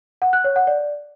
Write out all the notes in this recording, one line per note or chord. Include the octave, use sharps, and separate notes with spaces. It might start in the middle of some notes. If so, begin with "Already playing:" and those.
F#5
F#6
C#5
F#5
D5